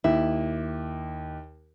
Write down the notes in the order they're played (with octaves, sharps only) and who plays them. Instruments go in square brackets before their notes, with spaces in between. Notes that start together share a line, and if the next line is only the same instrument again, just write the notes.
[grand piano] D#2 [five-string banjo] E4